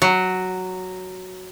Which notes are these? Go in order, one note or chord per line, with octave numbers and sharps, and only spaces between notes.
F#3